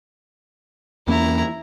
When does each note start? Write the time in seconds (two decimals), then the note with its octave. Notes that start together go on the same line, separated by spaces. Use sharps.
1.08 E2 A#3 C#4 E4 A#5